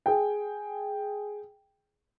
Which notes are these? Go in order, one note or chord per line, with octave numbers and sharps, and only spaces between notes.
G#4 G5